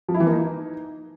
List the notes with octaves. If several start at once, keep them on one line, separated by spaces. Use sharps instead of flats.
F3
E4
E3
A#3
D#4